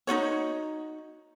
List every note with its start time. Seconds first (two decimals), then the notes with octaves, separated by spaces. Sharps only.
0.07 D#4 F4 F#4 C#5